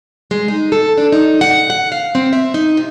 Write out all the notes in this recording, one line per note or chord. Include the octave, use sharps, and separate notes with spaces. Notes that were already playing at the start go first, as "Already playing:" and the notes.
G#3
D#4
A4
D4
D#4
F#5
F#5
F5
C4
E5
D#4
C3